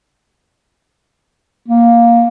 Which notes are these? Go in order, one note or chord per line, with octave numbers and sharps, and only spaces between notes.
A#3